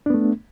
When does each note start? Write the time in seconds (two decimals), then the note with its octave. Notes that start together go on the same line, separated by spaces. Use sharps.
0.06 D4
0.10 B3
0.14 A3